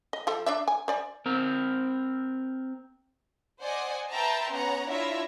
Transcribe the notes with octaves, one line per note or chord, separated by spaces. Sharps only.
D#5
F3 F4 A4
D4 D5 E5
G#5
C5 D5 G#5
C4 A#4
C5 D5 D#5 F#5 G#5
B4 E5 G5 A5 A#5 C6
B3 C#4 C#5 F#5 A#5
D4 E4 F4 C#5 E5 A#6